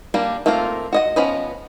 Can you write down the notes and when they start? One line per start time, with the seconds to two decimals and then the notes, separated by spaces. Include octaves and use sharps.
0.14 G3 A#3 D4
0.46 A3 A#3 C4 F4 A#4
0.93 F#4 D#5 F#5
1.16 F3 B3 C#4 B4 D#5